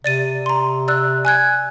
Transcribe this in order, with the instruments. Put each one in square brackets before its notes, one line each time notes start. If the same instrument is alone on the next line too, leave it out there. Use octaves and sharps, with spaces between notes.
[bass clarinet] C3 [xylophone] D5 A6 D#7
[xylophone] A#5 C6
D5 E6 F#6
G#5 F#6 G#6